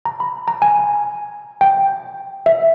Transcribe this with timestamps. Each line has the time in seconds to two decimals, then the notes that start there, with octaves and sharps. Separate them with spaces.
0.05 A#5
0.20 B5
0.48 A#5
0.62 G#5
1.61 G5
2.46 E5